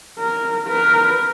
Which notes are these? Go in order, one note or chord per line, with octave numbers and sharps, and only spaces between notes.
A#4
A#4 B4